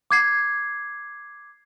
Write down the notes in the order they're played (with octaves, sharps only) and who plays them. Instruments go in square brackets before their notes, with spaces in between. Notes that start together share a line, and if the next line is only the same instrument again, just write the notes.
[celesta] D6 G#6 C7